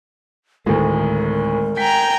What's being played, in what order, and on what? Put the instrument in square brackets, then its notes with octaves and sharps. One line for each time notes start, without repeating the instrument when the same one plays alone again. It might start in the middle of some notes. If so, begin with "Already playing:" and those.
[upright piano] D2 A2 [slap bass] D#3 G#3 [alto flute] A#4
[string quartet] G5 G#5 A#5 [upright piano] B6